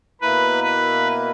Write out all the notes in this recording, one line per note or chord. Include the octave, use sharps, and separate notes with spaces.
B2 A#3 E4 A#4 B4
B4